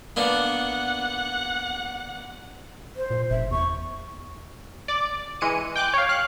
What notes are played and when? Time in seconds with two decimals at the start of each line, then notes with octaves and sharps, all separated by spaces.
0.16 A#3 B3 D4 F#5
2.96 C5
3.10 A#2
3.30 F1 E5
3.51 E2 C#6
4.88 D5 D6
5.41 E3 G#3 C#7 D#7
5.76 G5 D6 F#6 G6
5.93 C#5 F5
6.09 F5 F#6